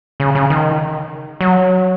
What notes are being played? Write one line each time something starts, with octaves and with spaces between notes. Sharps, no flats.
C#3
C#3
D#3
F#3